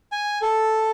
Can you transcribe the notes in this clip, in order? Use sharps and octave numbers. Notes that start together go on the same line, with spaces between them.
G#5
A4